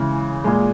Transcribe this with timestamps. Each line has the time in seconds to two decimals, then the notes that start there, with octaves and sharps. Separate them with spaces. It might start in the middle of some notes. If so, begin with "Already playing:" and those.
Already playing: C#3 E3 G#3
0.44 A#2 G#3